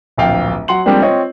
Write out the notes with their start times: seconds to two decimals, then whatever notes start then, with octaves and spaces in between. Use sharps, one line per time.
0.18 D1 A#1 F5 G5
0.68 F#3 F#5 C6 F#7
0.86 F3 G3 G#3 A#3 C4 D4
1.02 C4 F4 C#5 D#5